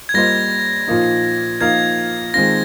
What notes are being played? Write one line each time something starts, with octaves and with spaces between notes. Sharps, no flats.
G#6
G3 A#3 F4 C5 D#5 A#6
A#2 F3 A#3 D#4
F3 A#3 D#4 A#4 F5 G#6
D#3 G#3 C4 F4 A#6